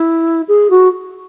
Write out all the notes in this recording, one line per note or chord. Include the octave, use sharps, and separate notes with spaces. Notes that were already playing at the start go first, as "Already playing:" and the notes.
Already playing: E4
G#4
F#4